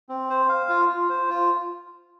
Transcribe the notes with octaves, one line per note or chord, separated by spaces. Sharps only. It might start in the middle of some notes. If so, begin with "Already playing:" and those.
C4
C5
F5
F4
F4
C5
F4